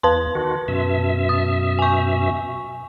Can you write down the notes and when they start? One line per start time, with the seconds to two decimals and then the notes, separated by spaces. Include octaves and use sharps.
0.03 E2 B4 A5 C6
0.35 D#3 F#4
0.68 F#2 B2 E5
1.29 D#6
1.79 G#5 C#6